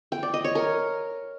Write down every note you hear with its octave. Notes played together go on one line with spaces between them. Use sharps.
G5
D5
D#5
C#5
A#4